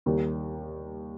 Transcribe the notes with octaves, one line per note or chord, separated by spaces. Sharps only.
D#2 D#3 G3